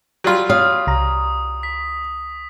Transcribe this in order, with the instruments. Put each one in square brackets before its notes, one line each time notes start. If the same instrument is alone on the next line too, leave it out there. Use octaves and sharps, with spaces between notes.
[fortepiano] F#3 G3 F4
[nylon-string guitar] C#5 F5 [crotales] D#6
[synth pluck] C2 A#5
[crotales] B6